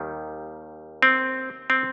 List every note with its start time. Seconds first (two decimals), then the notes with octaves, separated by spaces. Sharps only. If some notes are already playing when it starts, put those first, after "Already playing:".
Already playing: D#2 D#3 G3
1.02 C4
1.70 C4